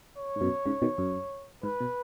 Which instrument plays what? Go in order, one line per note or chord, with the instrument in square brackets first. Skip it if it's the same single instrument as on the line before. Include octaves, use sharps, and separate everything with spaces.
[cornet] C#5
[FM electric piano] G#2
F#2 B2
G#2 C#3
B2 D#3
F#2
[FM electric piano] G#2 [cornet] B4
[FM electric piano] B2